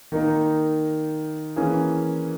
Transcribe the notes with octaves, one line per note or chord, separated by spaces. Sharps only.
D#3 A#3 D#4
E3 A#3 C#4 G#4